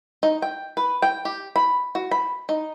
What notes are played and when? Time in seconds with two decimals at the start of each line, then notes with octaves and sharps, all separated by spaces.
0.23 D#4
0.42 G5
0.77 B4
1.02 G5
1.25 G4
1.56 B5
1.95 F#4
2.11 B5
2.49 D#4